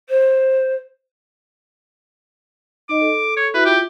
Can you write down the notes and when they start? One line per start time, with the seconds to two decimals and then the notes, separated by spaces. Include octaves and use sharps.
0.09 C5
2.89 D#4 D#5 D6
3.01 A4
3.36 C#5
3.54 E4 F#4 B4 E5
3.65 F4 G4